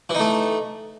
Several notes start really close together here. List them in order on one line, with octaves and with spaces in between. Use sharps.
E3 D#4 A3